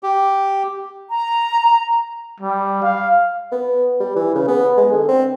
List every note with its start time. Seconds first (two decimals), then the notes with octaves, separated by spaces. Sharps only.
0.03 G4
1.10 A#5
2.40 G3
2.82 F5
3.52 B3
4.00 G3
4.16 E3
4.35 C#3
4.48 B3
4.77 G#3
4.92 D3
5.09 C4